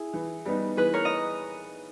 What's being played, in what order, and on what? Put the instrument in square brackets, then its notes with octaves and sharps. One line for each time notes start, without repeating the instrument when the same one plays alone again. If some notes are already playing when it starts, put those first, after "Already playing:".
Already playing: [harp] E4 G#4
[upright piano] E3
G3 B3 D#4
[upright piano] E3 [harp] G#4 B4
[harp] A#4 C#5
D#5